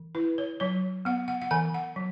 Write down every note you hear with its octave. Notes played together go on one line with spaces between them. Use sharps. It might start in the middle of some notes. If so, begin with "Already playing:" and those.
Already playing: E3
E4 B4
C#5
F#3 C#5
B3 F#5
F#5
F#5
E3 G#5
F#5
F#3